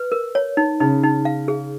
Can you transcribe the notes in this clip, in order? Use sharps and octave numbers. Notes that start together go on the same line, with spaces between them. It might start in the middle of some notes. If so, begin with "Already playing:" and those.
Already playing: B4
A#4
C#5
D#4
C#3 D#4
D#4
F5
G#4